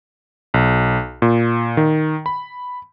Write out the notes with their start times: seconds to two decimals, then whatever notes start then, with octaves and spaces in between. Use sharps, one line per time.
0.54 B1
1.22 A#2
1.77 D#3
2.26 B5